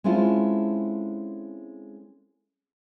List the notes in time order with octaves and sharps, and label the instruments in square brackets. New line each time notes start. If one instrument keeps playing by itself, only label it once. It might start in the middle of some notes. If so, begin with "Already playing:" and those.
[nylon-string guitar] G#3 C4 C#4 E4 F4 A4